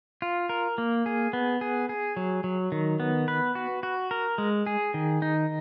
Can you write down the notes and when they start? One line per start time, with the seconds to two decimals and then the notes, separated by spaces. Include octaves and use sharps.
0.22 F4
0.49 A#4
0.78 A#3
1.06 G#4
1.33 B3
1.61 G#4
1.89 G#4
2.17 F#3
2.44 F#3
2.72 D#3
3.00 B3
3.28 B4
3.55 F#4
3.83 F#4
4.11 A#4
4.38 G#3
4.67 G#4
4.94 D#3
5.22 D#4